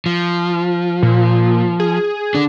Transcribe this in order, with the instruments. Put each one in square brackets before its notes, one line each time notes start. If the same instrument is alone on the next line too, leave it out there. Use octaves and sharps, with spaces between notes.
[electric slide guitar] F3
[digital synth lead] A#2
G#4
[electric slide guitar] D3 D4